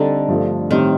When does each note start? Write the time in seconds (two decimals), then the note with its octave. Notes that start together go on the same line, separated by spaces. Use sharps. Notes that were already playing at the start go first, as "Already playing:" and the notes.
Already playing: D3 G3 C4 D#4 A4
0.28 G2 F3 A3
0.70 A2 D#3 G3 C4